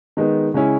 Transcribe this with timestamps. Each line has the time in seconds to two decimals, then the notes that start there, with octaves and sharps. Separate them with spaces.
0.17 D#3 G#3 B3 D#4
0.54 C#3 G#3 C#4 E4